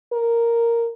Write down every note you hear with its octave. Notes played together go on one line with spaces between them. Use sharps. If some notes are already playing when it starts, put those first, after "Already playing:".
A#4